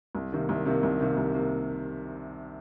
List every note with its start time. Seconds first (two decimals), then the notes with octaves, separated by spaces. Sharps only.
0.15 C2
0.32 C3 D#3 A#3
0.49 C2
0.65 C3 D#3 A#3
0.83 C2
1.00 C3 D#3 A#3
1.17 C2
1.34 C3 D#3 A#3